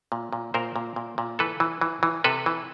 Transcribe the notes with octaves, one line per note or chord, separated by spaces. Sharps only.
A#2
A#2
A#2 A#4 C5
A#2
A#2
A#2
E3 A4 B4
E3
E3
E3
C3 A4 B4
E3